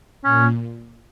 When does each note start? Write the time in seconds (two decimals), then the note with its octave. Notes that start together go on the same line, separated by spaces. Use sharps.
0.24 A#2 C#4